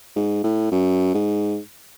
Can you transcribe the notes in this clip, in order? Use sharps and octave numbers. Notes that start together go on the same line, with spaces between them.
G#2
A2
F#2
G#2